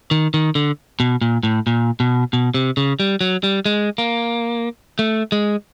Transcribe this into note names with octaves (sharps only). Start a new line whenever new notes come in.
D#3
D#3
D3
B2
A#2
A2
A#2
B2
B2
C3
C#3
G3
F#3
G3
G#3
A#3
A3
G#3